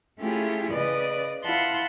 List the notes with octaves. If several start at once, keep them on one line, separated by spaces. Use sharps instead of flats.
A3 C#4 E4 F4 G4 G#4
C#3 B4 D5 D#5
E4 F4 F#5 A5 B5 C6